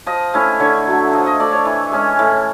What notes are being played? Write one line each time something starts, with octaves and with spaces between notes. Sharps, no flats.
F3 D#5
A3 C#4 E4
D3 C#5
F#3 A3
F3 D#5
D#5
A3 D4 D5
C#5
E3
G#3 C#4
A2